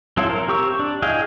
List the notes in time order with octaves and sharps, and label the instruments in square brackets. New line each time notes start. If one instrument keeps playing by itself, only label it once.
[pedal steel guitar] F#3 C4 E4 F4 A4
A#4
C4 G4 C#6 E6
D4
E4 G#4 D#5 F5 G5